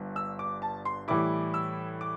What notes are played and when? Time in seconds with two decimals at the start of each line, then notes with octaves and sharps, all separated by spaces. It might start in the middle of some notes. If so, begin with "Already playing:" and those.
Already playing: G1 G2
0.16 E6
0.39 D6
0.62 A5
0.85 C6
1.08 A2 E3 G3 E4 D6
1.54 E6
2.01 D6